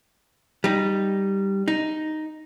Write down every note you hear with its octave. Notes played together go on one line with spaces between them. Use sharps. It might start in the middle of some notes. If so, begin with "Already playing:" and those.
G3 D#4
D#4